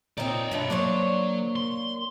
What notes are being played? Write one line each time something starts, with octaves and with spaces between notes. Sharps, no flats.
A#2 C4 D#4 C#5 D5
G2 B2 A3
F#3 A#3 D4 C5 C#5
C6